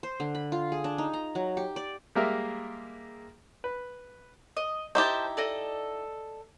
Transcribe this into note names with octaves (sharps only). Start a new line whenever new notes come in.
C5
D3
B5
F4
G#4
D4
D#4
A#5
F#3
G4
D5
G3 G#3 A#3 A#4 E5
B4
D#5
D#4 E4 G4 C5 A5
A4 D5 D#5